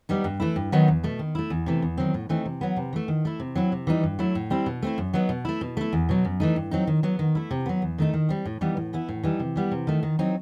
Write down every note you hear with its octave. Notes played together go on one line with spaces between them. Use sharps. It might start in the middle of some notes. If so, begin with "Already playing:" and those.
G3 B3 D#4
G2
E3 A3 E4
G2
D#3 F#3 B3 D#4
E2
B2 A3
D#3
A3 E4
E2
C3 E3 A3
E2
D#3 F#3 C4
A2
E3 A3 C4 D#4
C3
F#3 B3
C3
E3 A3
D#3
A3 E4
C3
F#3 C4 E4
C3
E3 G3 D#4
G2
F#3 A3 E4
A2
G3 C4 E4
B2
A3 C4 E4
F#2
F#3 B3 D#4
B2
A3 E4
B2
A3 E4
E2
B2 F#3
F#2
E3 A3 D#4
G2
F#3 C4 D#4
D#3
F#3 B3
D#3
A3 E4
C3
F#3 B3
E2
D#3 A3 D#4
D#3
G3 C4
A2
E3 G3 B3 D#4
A2
E3 B3 E4
A2
E3 G3 D#4
C3
E3 G3 B3
C3
D#3 A3
D#3
F#3 C4 D#4